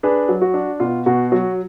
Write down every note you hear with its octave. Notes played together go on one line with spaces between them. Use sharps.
D4 G#4 B4
F#3
F#4
D4
B2 F4
B2 F#4
F#3 F#4